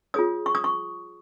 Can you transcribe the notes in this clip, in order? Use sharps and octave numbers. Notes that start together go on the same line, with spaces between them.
F4 G#4 C#5 D#6
C#6
D#6
C#6